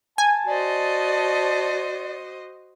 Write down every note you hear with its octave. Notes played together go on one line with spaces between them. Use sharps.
G#5 A5
F#4 C5 D5 D#5